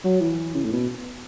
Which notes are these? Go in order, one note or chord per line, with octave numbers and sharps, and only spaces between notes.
F#3
E3
C#3
A2
B2